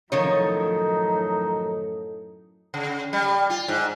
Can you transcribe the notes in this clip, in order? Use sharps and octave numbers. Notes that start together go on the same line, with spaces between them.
F#2 A2 D#3 F3 F#3 D#4 A4 C#5
C#3
G3
F4
G#2